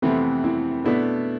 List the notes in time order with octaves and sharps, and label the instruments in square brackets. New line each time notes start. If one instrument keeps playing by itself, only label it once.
[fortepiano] F2 C3 E3 B3 [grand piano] A3 C4
[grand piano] C4 E4
[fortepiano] B2 A3 E4 [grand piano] B3 D4